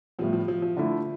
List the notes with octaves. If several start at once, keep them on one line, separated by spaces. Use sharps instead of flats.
A2 F3 G3 B3
F3
F3
F3
D3 A3 E4